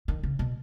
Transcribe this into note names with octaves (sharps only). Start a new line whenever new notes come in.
D#3
C#3
B2